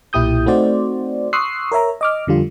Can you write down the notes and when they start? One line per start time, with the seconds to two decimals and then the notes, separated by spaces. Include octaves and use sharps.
0.13 B1 A#2 E4 G4 D#6 G6
0.46 A3 C4 D#4 F#4 C5 D5
1.33 C6 C#6 D#6 E6 F#6 C7
1.72 A#4 C#5 E5 A#5
2.01 D#5 D6 F6
2.27 F2 D3 G3 F4